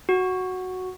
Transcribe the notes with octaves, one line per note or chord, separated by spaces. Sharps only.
F#4